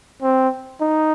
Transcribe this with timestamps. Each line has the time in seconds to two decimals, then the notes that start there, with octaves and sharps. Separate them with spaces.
0.22 C4
0.81 D#4